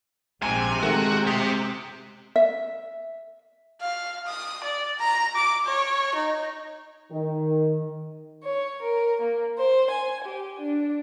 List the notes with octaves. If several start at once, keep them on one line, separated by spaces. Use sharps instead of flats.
A#1 G#2 C3 G#5
D#3 G#3 A3 F#4
G4 E5 D#6
E5
F5
D#6
D5
A#5
D6
C#5
D#4
D#3
C#5
A#4
A#3
C5
G#5
G4
D4